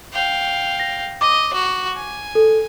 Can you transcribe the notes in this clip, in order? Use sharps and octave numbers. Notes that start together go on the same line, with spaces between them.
F5 G5
A#6
D#5 D6
F#4
G#5
A4